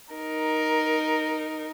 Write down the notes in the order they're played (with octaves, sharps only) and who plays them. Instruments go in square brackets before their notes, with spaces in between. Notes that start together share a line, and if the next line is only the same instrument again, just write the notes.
[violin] D#4 A#4